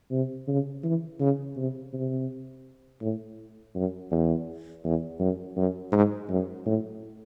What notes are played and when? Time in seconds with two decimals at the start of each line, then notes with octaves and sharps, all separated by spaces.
0.11 C3
0.48 C#3
0.83 E3
1.20 C#3
1.57 C3
1.93 C3
3.01 A2
3.75 F#2
4.11 E2
4.84 E2
5.19 F#2
5.57 F#2
5.92 G#2
6.29 F#2
6.66 A2